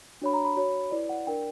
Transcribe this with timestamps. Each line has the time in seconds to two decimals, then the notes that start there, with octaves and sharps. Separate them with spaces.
0.22 D4 F#4 C#5 B5
0.33 A#5
0.45 B5
0.56 F#4 C#5
0.91 E4 B4 D5
1.09 F#5
1.27 D4 A#4 D5 G5